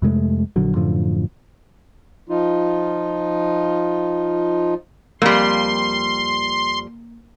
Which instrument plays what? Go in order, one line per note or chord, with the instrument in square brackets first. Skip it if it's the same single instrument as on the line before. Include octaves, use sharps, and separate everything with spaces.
[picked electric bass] F2 C3 G#3 A3
A#1 D3 F#3
F#2 A2 D3 F3
[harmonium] F3 D#4 F4
[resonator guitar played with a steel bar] F2 G3 [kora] A#3 [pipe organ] C6